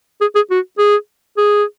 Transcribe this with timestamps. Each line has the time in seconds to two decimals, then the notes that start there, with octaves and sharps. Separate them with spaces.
0.21 G#4
0.35 G#4
0.50 F#4
0.78 G#4
1.37 G#4